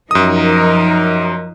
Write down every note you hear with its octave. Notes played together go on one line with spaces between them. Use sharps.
F#2 F3 D#4 A#4 D#6